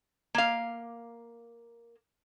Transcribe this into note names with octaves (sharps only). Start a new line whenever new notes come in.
A#3 F5